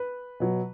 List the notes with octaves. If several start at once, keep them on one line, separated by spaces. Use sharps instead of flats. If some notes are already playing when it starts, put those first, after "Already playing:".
Already playing: B4
B2 F#3